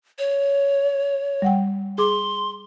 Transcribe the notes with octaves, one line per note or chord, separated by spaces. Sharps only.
C#5
G3 F#5 G5
G#4 C6 D6